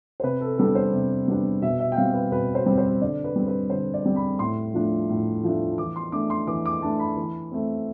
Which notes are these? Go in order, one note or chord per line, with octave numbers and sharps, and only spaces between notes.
C5
C3 B4
A4
G3 B3 D4 A4
C5
C3
G3 B3 D4
B2 E5
E5
G5
G3 C4 F5
B4
B2 B4
C5
G3 C4
C5
D3 D5
B4
G3 C4
B4
D3 C5
D5
G3 C4
B5
A2 C6
F3 A3 D4
A2
F3 A3 D4
E3 D6
C6
A3 D4 D6
C6
E3 D6
D6
A3 D4 A5
B5
E3
A3 C4